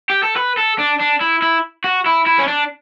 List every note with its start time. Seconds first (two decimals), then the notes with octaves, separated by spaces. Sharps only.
0.10 G4
0.23 A4
0.36 B4
0.57 A4
0.79 D4
1.00 D4
1.21 E4
1.42 E4
1.84 F#4
2.06 E4
2.27 E4
2.39 C#4
2.48 D4